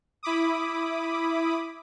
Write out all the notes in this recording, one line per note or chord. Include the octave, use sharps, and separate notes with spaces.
E4 B5 D6 D#6